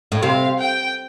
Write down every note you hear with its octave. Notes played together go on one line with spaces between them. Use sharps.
A2
C3 F5
G5